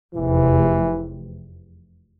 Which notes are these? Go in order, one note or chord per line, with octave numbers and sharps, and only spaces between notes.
F1 E2 C3 E3